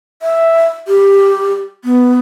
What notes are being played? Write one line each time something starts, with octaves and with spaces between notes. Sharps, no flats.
E5
G4
B3